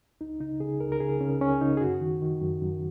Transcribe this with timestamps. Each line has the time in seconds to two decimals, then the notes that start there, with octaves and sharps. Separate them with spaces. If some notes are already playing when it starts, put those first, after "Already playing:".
0.21 C#2 D#4
0.40 C#3 D#4
0.60 C#3 G#4
0.80 C#2 A#4
0.92 A#4
1.00 C#3 G#4
1.21 C#3 C#4
1.40 C#2 C#4
1.61 C#3 D#4
1.77 G#4
1.81 F#2 F#4
2.01 D#3
2.22 D#3
2.42 F#2
2.62 F#2